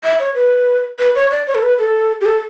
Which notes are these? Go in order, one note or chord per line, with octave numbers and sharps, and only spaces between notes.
E5
C#5
B4
B4
C#5
D5
C#5
A4
B4
A4
G4
A4